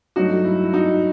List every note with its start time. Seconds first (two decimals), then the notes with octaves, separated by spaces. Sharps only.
0.16 G2 F#3 A3 D#4 F#4
0.44 E4
0.63 E4
0.73 D#4 F#4